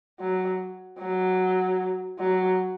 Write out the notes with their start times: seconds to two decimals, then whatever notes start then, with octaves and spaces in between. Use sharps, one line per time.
0.20 F#3
0.99 F#3
2.19 F#3